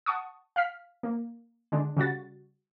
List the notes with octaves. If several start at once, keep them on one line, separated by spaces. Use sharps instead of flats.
F#5 A5 C#6 D#6
F5 F6 B6
A#3
D3 G#3 D4
C#3 G3 F#4 A6